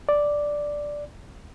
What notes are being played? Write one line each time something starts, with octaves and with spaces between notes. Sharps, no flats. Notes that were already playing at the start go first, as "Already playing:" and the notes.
D5